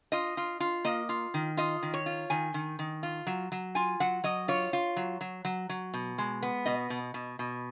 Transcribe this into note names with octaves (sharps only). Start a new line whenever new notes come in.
F4 D#5
F4
F4
A#3 D#5
F4
D#3
F4 D#5
D#3
C#5
F4
D#3 G#5
D#3
D#3
F4
F#3
F#3
F4 G#5
F#3 F#5
F#3 D#5
F4 C#5
F4
F#3
F#3
F#3
F#3
B2
G#3
B3
B2 D#5
B2
B2
B2